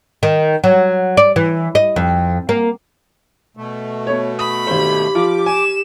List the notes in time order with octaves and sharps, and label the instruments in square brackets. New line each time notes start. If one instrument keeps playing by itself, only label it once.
[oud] D#3
F#3
D5
E3
D#5
F2
A#3
[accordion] B2 A3
[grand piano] B3 C#5
[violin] B5 [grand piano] D#6
[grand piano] G#1 C5 [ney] G4
[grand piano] F3 F4 [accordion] D6
[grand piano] G#5 [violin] E7